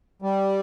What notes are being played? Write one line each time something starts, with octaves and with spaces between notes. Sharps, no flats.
G3